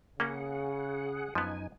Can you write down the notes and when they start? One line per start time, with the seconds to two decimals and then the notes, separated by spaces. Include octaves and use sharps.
0.20 C#3 A#3 C#4 G#4 F#5
1.35 F#2 F3 B3 D#4 G#5